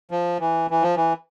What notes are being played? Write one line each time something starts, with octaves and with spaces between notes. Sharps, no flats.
F3
E3
E3
F3
E3